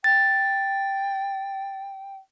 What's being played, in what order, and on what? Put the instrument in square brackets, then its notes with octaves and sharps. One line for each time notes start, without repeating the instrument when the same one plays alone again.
[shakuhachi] G5 [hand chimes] A6